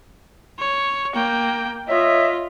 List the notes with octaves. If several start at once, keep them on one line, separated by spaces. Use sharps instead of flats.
C#5
A#3 G5
F4 C#5 D#5 E5